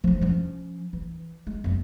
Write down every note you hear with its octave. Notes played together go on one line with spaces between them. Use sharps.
F3 D4
F3 C#4
E3
G#3
F#2 B3